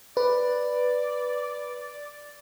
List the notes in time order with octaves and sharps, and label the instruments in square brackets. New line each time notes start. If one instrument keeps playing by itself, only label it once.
[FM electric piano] B4 [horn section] D5